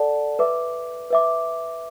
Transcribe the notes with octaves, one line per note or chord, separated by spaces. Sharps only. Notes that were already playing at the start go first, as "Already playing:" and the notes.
Already playing: A4 D5 F#5 A5
B4 E5 D6
B4 E5 D6